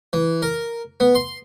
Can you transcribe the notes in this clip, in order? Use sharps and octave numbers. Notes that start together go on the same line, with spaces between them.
E3
A#4
B3
C6